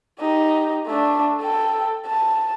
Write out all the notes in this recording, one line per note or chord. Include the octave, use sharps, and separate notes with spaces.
D#4 G4
A3 D4
A4 G5
A5